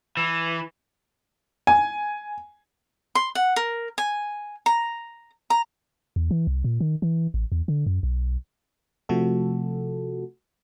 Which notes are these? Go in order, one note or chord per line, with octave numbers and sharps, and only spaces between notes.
E3
G#5
C6
F#5
A#4
G#5
A#5
A#5
E2
E3
C2
A#2
D#3
E3
A1
E2
D3
F#2
B1
C3 F3 A3 F#4 A4